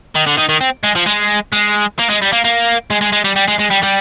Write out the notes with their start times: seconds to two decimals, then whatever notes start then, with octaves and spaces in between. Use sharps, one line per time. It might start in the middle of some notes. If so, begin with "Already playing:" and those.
0.15 D#3
0.26 D3
0.38 D#3
0.49 D#3
0.61 C4
0.84 G#3
0.96 F3
1.06 G#3
1.52 G#3
1.99 A#3
2.09 G#3
2.22 G3
2.33 A#3
2.44 A#3
2.90 G#3
3.01 G#3
3.13 G#3
3.25 G3
3.36 G3
3.48 G#3
3.59 G#3
3.70 G3
3.83 G3